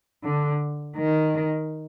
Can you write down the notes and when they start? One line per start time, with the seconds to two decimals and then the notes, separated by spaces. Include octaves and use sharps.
0.24 D3
0.97 D#3